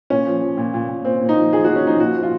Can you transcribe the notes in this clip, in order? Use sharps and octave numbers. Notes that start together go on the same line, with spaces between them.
A#2 C#4
F3
F3
A#2
A#2
A#2
A#2 C4
A#2
D#4
F3
F3 G#4
F3 F#4
C#4
F3 D#4
A#2 F#4
F3
F4